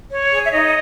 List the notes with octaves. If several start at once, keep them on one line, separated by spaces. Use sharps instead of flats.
C#5
G#4
E5
D#4 D#5